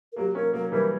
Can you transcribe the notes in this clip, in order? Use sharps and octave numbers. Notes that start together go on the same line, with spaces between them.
A#4
F#3 A#3 G4
A#3 C#4 A#4
F#3 A#3 A#4
E3 G3 A#4